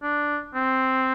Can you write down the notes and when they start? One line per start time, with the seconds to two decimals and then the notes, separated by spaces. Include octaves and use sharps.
0.03 D4
0.55 C4